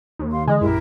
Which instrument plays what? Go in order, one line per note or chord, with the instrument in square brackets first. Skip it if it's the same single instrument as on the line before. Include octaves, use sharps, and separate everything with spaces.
[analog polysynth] D#2
[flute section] F5 C6
[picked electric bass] D3 E3 [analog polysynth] G#3 [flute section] D#5
[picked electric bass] A#1 F#2 [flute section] E4 G4 A#4